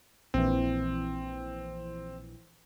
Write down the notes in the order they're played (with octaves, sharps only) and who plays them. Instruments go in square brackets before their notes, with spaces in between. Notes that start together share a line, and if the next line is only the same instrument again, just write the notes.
[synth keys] A#1 E3 [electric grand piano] C4